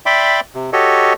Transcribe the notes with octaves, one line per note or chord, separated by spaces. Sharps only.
D5 E5 G5 B5 C6 D6
C3
F#4 G4 A4 C#5 D#5